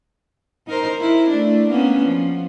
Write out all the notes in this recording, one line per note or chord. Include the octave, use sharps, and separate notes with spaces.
D#4 A#4 C5
E4
A3 D4
A#3 B3 C#4
F3